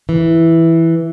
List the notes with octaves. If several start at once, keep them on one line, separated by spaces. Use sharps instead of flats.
E3